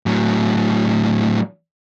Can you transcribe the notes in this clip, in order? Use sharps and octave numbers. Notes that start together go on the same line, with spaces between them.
A2 F#3